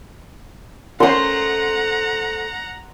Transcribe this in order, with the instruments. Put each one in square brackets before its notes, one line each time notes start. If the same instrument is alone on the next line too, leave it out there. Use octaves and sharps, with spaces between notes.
[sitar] A3 C5 [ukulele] C#4 A#4 [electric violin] F#5 A#5 [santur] C6 D#6